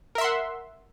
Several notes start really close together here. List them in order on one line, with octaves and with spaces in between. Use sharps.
A#4 E5 C6 F#5